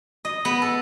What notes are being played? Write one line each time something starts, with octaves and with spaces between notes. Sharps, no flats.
D#5
B3
A4